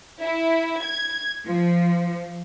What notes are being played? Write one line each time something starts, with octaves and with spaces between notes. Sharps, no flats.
E4
G#6
F3